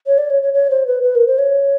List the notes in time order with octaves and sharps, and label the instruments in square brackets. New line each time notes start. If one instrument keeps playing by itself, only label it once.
[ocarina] C#5
D5
C#5
C#5
C#5
C5
B4
B4
A#4
C5
C#5